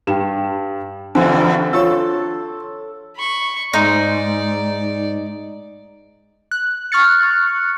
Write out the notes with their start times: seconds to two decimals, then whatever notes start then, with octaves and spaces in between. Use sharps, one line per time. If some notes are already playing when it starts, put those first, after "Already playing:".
0.07 G2 G4 G5 E7
1.15 E2 G2 B2 D3 C4 F#5 G#5
1.73 F4 A4 C#5 C#6 E6
3.17 B5 C#6
3.73 G#2 D#4 D5
6.51 F#6
6.92 C#6 F6 F#6 A6 C#7